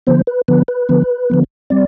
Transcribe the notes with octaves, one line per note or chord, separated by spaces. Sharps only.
D3 F3 B3 C5
B4
D3 F3 B3 B4
B4
D3 F3 B3
D3 F3 B3
G3 C4 D5